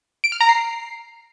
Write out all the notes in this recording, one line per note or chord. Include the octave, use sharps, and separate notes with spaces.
D7
F6
A#5
C7